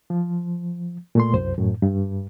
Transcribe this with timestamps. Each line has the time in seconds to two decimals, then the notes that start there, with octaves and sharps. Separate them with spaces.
0.10 F3
1.15 A#2 A3 C6
1.34 C2 F#2 C5
1.58 F#2 A2
1.82 G2